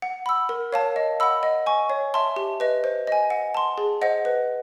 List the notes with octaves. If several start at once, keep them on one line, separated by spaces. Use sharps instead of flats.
F#5
B5 E6
A#4
C#5 F5 A5
D#5
F#5 B5 E6
D#5
G#5 C#6
C#5
E5 A5 C6
G4
B4 D#5
C5
D#5 G#5
F#5
A5 C6
G#4
C5 D#5 F#5
B4